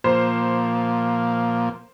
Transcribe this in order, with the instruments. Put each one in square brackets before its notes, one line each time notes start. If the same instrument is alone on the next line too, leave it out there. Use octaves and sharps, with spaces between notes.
[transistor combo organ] A#2 F3 A#3 [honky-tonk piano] C5